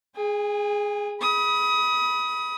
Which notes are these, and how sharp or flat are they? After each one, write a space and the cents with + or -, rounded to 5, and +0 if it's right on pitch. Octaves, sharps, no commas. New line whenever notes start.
G#4 +0 G#5 -40
B5 -10 D#6 +25